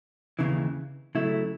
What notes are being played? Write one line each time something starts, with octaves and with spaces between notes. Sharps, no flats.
D#2 C#3 E3
C#3 F#3 A3 E4